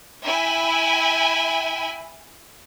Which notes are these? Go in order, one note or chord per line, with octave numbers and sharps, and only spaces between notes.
E4 E5 G5 G#5 B5